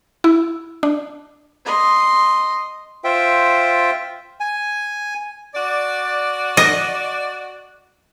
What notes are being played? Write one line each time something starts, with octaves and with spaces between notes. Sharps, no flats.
E4
D4
D#5 C6
F4 C5 E5 G5
G#5
F#4 D5
D#5